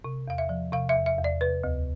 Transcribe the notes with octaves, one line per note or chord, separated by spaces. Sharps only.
C3
E2 F5
E5
F3
C3 F5
E5
E2
E5
E2
D5
C3 B4
D2